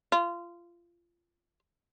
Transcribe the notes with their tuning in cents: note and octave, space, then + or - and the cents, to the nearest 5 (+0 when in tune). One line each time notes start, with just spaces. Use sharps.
F4 -20